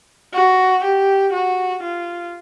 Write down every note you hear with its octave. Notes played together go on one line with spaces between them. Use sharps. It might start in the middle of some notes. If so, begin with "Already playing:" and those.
F#4
G4
F#4
F4